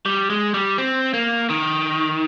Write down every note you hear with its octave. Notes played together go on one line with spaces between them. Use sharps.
G3
G#3
G3
C4
A#3
D#3